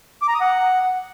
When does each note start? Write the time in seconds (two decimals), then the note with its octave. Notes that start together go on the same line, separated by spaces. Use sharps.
0.22 D6
0.28 A#5
0.35 D#6
0.41 F#5